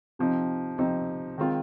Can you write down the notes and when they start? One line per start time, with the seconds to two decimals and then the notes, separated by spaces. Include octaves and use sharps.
0.19 C3 F3 C4 D#4
0.78 C3 F3 C4 D#4
1.38 D#3 G#3 C4 F4